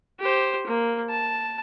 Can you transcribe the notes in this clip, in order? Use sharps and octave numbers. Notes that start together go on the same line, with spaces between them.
G4 C5
A#3
A5